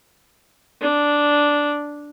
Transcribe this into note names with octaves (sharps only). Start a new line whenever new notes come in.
D4